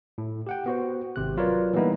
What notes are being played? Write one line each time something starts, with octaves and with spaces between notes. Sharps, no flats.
A2
G4 F#5 G5
B3 F#4 C5
G#1 C3 F#6
F#3 F4 A#4 B4 C#5 D5
E3 G3 A#3 B3 D#4 E4